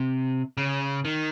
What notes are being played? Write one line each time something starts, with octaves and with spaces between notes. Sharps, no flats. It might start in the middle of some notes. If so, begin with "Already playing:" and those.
Already playing: C3
C#3
D#3